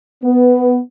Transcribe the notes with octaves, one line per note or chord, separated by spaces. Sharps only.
B3